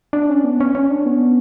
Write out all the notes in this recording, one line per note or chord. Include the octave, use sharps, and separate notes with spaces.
D4
C#4
B3
C#4
C#4
D4
B3